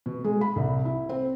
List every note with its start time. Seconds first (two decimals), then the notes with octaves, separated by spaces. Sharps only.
0.06 B2
0.24 G#3
0.41 B5
0.56 C2
0.85 E4
1.09 C4